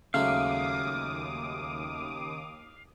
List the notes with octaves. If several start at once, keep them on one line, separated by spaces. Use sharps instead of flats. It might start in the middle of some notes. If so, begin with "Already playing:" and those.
D#2 C#3 F#3 G#3 A3 F5 D6 D#6